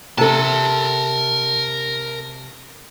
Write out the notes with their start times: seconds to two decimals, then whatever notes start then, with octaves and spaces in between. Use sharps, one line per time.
0.18 C3 A4 A#4 A5